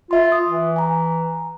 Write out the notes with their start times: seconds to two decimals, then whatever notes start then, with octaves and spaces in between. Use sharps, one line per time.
0.11 F4 E5 C6
0.32 D#6
0.48 E3
0.76 G#5 A#5